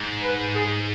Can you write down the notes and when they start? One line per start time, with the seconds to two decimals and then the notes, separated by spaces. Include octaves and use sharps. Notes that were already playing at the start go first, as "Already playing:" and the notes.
Already playing: G#2
0.23 B4
0.55 G#4